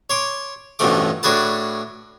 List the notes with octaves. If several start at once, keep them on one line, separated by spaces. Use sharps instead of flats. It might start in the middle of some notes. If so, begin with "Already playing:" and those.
C#5 C6 D6
A1 G2 B2 F3 A3 D6
A2 D4 F#4 G#4 B4 A5